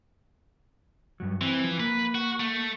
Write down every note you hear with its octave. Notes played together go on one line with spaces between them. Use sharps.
G2 F#3
E3 C4
F3
A#3 B4
F#4
A3